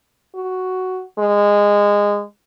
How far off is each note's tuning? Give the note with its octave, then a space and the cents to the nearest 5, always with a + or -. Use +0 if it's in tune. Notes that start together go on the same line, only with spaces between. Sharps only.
F#4 +5
G#3 -20